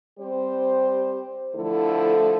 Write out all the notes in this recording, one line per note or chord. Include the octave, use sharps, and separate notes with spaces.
G3 C4 G4 C5
D3 F3 A3 E4 A4